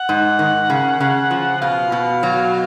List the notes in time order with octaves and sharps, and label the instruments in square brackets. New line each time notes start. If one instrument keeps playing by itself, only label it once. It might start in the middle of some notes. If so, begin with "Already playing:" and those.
Already playing: [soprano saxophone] F#5
[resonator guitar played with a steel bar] G#2
D#3
C#3
C#3
F3
[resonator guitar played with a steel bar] B2 [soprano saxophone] F5
[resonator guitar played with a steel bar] B2
F#3